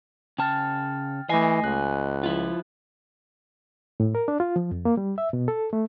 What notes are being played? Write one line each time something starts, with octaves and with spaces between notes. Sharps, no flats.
C#3 G5 A5 F6 A6
E3 A3 D#5 G#5 A#6 C7
C#2 F#6
F3 E4 F4
A2
A#4
D4
F4
F3
F2
A#3
G3
E5
B2
A4
A3